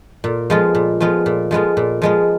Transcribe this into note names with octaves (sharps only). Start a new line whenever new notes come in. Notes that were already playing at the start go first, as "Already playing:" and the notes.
A#2
F3 G#3 B3 F4
A#2
F3 G#3 B3 F4
A#2
F3 G#3 B3 F4
A#2
F3 G#3 B3 F4